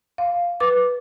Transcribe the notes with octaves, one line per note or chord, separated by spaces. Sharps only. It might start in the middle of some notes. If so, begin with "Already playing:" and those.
F5
B4 D6